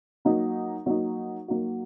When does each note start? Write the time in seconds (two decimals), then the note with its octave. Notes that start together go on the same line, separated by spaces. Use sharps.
0.25 F#3 A#3 D#4 F#4
0.86 F#3 A#3 D#4 F#4
1.48 F#3 A#3 D#4 F#4